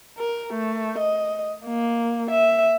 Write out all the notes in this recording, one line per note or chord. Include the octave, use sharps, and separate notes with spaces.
A#4
A3
D#5
A#3
E5